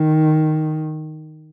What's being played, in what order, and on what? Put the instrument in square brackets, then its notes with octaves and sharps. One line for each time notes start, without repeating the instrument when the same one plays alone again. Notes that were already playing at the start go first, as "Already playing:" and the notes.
Already playing: [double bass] D#3